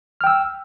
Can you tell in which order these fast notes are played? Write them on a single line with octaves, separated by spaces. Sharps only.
F6 G5 E6